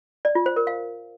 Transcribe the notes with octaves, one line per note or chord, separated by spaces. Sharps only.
D5
F4
C5
A#4
F5